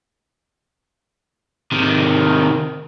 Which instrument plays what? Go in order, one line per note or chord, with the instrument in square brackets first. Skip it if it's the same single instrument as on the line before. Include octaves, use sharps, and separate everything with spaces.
[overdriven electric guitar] C3 D#3